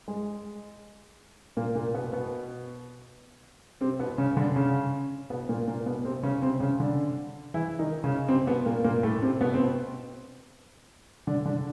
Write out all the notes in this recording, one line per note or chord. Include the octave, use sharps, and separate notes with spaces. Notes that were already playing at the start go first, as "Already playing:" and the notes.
G#3
A#2 A#3
A#2 A#3
B2 B3
B2 B3
C3 C4
B2 B3
C#3 C#4
D3 D4
C#3 C#4
B2 B3
A#2 A#3
A#2 A#3
B2 B3
C3 C4
C#3 C#4
C3 C4
C#3 C#4
D3 D4
E3 E4
D#3 D#4
C#3 C#4
C3 C4
B2 B3
A#2 A#3
A#2 A#3
A2 A3
C3 C4
B2 B3
C4
B2 B3
D3 D4
D3 D4